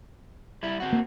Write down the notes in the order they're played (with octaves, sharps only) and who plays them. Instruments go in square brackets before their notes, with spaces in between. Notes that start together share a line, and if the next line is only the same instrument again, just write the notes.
[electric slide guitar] G3 E4
C4 F#4
[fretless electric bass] A#3